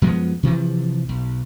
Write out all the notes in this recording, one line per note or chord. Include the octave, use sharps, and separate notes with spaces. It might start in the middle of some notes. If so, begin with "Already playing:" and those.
F#2 F3 G#3 B3
C3 E3 F3
B1